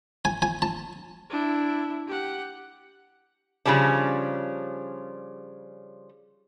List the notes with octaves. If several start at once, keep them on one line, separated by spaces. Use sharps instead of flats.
G#5
G#5
A5
D4 E4
G4 F#5
C#3 F3 G3 C#4 D4